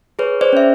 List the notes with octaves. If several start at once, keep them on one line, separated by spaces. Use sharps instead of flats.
G#4 B4 C#5
C5 D5
C#4 E5